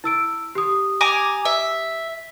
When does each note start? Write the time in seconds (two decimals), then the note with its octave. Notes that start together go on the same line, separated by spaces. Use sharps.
0.04 E4 E6 D7
0.55 G4 D#6
1.01 G#5 A#5 D6
1.45 E5